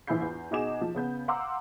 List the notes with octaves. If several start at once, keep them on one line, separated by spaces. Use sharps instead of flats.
A#1 E3 E4 B5 G6 C7
E2
B2 D#4 F#4 G#4 D6 E7
F3
C#3 B3 G6
F5 F#5 A#5 C6 D6 E6